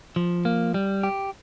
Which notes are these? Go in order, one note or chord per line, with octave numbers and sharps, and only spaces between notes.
F3
A#3
G3
G4